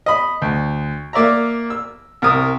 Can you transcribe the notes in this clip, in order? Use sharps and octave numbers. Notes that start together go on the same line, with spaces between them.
D#5 B5
D2
A#3 D5 E5 A#5
E6
C2 A#4 D#6